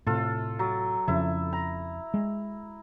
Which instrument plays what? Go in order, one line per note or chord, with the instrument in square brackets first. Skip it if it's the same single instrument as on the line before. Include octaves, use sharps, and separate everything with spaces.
[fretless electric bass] A2 C3 [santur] F4 A4
[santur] F#3
[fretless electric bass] F2 C#3 [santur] E4
[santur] A#5
[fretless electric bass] G#3